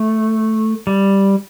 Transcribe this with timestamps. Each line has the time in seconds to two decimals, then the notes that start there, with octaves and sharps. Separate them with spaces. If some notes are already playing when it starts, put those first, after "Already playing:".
Already playing: A3
0.87 G3